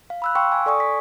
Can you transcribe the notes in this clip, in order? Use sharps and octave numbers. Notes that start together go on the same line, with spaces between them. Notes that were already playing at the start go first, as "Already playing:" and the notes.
F5
B5 E6 F#6
F5 G5 C6 C#6 E6
G#5
A4 D5 G#5 C#6 D#6
B6